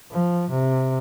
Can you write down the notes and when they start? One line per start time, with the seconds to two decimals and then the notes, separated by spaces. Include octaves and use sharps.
0.12 F3
0.50 C3